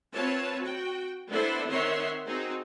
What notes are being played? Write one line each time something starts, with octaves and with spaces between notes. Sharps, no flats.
C4 F4 B4 C#5 A5
F#4 G5
B3 D4 E4 A4 C5
D#3 C4 C#5 E5 F#5 C6
C4 D#4 F#4 G#4